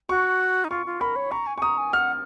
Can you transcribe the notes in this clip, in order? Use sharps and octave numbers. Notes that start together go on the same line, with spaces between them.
F#4 C#6
D#4
F4 C#6
F4
A#4 B5
C#5
A#5 C#6
G#5
G#5 C#6
A#5 D#6
G#5
F#5 F6